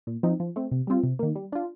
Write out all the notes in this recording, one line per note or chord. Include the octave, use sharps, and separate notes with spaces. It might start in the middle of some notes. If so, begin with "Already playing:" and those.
A#2
F3 C4 D#4
F3
A3 C4
C3
G3 C4 F4
C3
D#3 A#3
G3
D4 F4